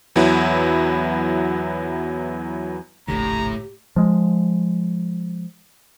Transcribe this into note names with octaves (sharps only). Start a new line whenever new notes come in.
E2 F#3 B3 E4
F1 A#1 A2 D3 G4 A#5
F3 G#3